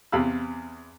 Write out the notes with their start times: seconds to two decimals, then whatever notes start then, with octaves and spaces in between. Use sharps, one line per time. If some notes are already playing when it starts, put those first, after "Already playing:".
0.12 E2 C3 F5 B5 E6